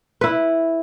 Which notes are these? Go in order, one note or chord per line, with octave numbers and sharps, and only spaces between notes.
E4 B4